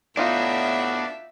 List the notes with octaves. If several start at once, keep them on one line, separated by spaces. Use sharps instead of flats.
A2 B3 D4 D#4 F4 F#4 E5